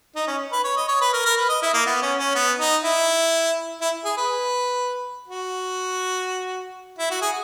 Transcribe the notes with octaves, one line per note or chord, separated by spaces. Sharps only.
D#4
C#4
B4
C#5
D#5
C#5
B4
A#4
A#4
B4
D#5
E4
A#3
B3
C#4
C#4
B3
D#4
E4
E4
G#4
B4
F#4
E4
F#4
G#4